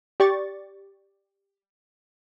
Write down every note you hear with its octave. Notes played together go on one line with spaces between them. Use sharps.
G4 D5 C#6 A6